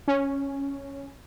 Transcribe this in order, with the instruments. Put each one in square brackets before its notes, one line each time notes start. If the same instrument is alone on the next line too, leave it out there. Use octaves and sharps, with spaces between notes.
[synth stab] C#4